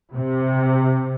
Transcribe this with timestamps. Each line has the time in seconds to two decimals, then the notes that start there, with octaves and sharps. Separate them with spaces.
0.15 C3